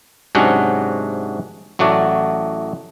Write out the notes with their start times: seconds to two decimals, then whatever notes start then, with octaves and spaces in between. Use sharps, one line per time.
0.35 G#2 C3 F#3 C#4 D4 F#4
1.79 A1 F#3 A3 F#4 D5